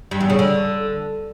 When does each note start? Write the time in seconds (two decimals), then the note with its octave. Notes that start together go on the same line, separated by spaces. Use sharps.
0.11 G2
0.21 E2
0.30 C#3
0.39 D3